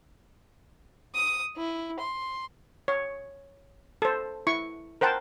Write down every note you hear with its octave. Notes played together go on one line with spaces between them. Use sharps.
D#6
E4
C6
C#5
A4 C5
E4 C#6
A#4 C5 F#5 G5 A5